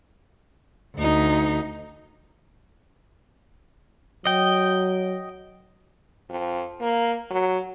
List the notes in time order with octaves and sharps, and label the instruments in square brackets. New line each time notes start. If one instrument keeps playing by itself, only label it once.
[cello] D2 D#4
[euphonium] F#3 [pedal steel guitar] D#5 G5
[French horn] F2
A#3
F#3